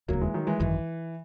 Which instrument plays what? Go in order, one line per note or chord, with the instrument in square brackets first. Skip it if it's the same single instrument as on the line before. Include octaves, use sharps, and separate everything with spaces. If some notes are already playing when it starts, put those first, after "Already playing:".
[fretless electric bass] E1 D#2 C#3 [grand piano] F#3 A#3
[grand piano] E3 G#3
D#3 F#3
E3 G#3
[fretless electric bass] G#1 F#2 D#3 [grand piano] E3